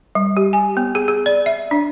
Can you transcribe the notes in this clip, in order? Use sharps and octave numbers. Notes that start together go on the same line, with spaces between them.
G3
G4
G#5
B3
G#4
G#4
D5
E5
D4